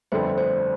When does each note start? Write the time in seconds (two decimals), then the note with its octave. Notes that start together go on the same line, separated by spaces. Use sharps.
0.12 G1 F2 D3 A3 C5
0.38 C5